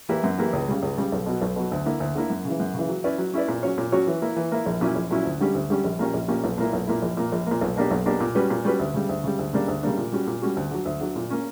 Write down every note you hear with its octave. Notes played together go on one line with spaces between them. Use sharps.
E3 A#3 E4 G4
F#2
E3 A#3 E4 G4
C#2
C#3 G3
C#2
C#3 G3
B1
B2 F#3
B1
B2 F#3
D2
D3 A#3 E4
D2
D3 A#3 E4
F#2
C#3 E3
F#2
C#3 E3
F#3
C#4 E4 B4 D5
F#3
C#4 E4 B4 D5
A#2
F#3 C#4 F#4 C#5
A#2
F#3 C#4 F#4 C#5
E3
A#3 E4
E3
A#3 E4
A#1
A#2 F#3 C#4 E4
A#1
A#2 F#3 C#4 E4
D2
D3 G3 C#4 G4
D2
D3 G3 C#4 G4
A#1
A#2 A#3 C#4 G4
A#1
A#2 A#3 C#4 G4
B1
A#2 A#3 E4
B1
A#2 A#3 E4
A#1
A#2 A#3
A#1
A#2 A#3
B1
B2 A#3 D4 G4
B1
B2 A#3 D4 G4
A#2
G3 C#4 F#4 B4
A#2
G3 C#4 F#4 B4
D2
C#3 G3
D2
C#3 G3
D2
C#3 G3 A#3 D4
D2
C#3 G3 A#3 D4
A#2
G3 C#4 F#4
A#2
G3 C#4 F#4
D2
D3 F#3
D2
D3 F#3
A#2
A#3 C#4